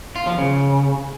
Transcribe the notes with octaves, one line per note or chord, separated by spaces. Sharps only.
F4
F3
C#3